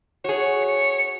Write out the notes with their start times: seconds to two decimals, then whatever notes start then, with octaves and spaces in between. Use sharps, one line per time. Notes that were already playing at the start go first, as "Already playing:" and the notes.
0.24 F#4 G#4 C#5
0.64 C#7